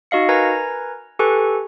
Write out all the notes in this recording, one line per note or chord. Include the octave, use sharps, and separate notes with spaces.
D#4 F#4 D#5 F5 C#7
A#4 B4 G#5 A#5 G#6 A#6
G4 A4 B4 G#5 C#6 F#6